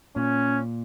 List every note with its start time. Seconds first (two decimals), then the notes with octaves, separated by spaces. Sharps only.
0.16 A#2 C#4